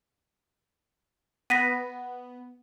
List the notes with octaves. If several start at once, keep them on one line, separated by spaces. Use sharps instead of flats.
B3 A#6 B6 D#7